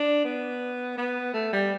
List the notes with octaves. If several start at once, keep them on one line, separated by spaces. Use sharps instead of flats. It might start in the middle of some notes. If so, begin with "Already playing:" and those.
Already playing: D4
B3
B3
A3
G3